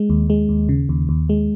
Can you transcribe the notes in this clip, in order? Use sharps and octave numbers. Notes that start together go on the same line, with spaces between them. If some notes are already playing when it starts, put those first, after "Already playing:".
Already playing: G#3
D#2
G#3
D#2
C#3
D#2
D#2
G#3